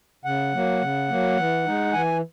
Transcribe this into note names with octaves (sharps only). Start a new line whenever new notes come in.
C#3 F#5
F#3 A#3
C#3
F#3 A#3
E3
G#3 D#4
E3 G#5